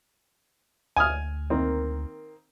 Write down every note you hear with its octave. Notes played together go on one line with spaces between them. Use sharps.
D2 G#5 D#6 F6
D#3 A#3 C4